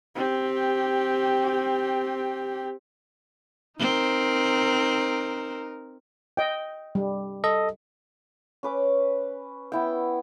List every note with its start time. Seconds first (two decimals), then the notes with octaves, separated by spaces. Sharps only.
0.15 C4 G4
3.79 C4 D#4 A#4
6.37 D#5 G5
6.95 G3
7.44 A4 D#5
8.63 C#4 B4 D6
9.72 B3 E4 G5